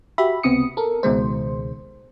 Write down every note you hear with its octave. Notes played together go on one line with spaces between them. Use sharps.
F#4 G4 E5 B5
C#2 C3 B3 C4 D#6 C#7
A4 A#4
C#2 B2 D#3 G#3 C5